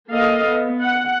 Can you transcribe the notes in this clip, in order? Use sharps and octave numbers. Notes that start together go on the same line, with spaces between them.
A#3 A4 D#5 F5
B3
F#5